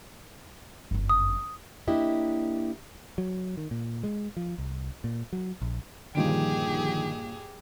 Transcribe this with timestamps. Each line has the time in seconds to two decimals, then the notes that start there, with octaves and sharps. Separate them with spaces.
0.91 G1 F#2
1.09 D#6
1.88 A#3 D4 E4 G4 D#5
3.18 F#3
3.57 D#3
3.71 A#2
4.03 G#3
4.37 F3
4.58 C2
5.04 A#2
5.33 F#3
5.62 A#1
6.15 G2 A#2 D3 D#3 F3 G4 G#4 D7